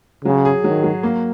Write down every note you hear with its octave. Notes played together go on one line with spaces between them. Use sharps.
C#3 F#3
G#4
D#3 F#3
F#3
A#3